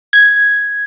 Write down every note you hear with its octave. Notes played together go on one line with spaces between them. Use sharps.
G#6